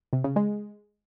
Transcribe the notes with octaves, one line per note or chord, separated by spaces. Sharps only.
C3
C#3
G#3